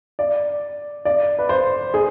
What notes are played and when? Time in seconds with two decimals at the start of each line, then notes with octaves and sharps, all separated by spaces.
0.19 D5
1.05 D5
1.39 B4
1.49 C5
1.94 G#4